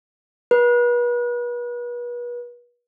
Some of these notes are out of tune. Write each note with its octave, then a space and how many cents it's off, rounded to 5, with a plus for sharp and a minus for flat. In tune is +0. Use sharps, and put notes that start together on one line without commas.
B4 -35